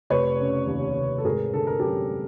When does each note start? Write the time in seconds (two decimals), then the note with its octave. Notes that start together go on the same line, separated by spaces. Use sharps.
0.10 F1 B4 C#5
0.39 C#3
0.67 D#2
0.96 F1
1.18 A4
1.24 G#1 G#4 A#4
1.53 D3 A4
1.67 A#4
1.79 F#2 G4 A4